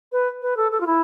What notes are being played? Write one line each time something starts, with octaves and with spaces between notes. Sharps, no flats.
B4
B4
A4
A4
F4
E4